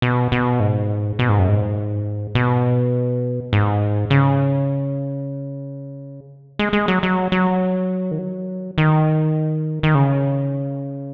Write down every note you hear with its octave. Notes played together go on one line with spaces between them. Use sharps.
B2
B2
G#2
B2
G#2
F#2
G#2
B2
G#2
C#3
G#3
G#3
F#3
F#3
F#3
D#3
F#3
D#3
D#3
C#3